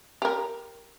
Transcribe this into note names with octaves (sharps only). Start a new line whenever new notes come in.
G4 A#4